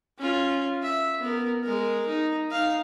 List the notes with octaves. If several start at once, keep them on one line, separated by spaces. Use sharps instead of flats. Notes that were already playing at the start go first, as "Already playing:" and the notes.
C#4 F4
E5
B3 A#4
G#3 A#4
D#4
D#4 F5